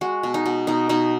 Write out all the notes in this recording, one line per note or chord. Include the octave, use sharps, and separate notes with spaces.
G#3 F#4
B2
D#4
B2
B2 D#4
B2 D#4